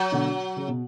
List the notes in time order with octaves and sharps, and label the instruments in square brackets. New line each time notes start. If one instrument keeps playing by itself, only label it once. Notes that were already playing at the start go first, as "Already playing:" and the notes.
Already playing: [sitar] F#3
[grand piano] B2 D3
C#3
B2